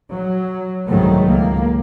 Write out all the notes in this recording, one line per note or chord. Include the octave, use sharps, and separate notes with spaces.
F#3
C2 G#2 D#3 F#3 A3 B3
C#2 A#3